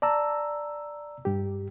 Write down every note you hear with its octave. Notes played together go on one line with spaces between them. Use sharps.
D5 A5 A#5 E6
G2 G4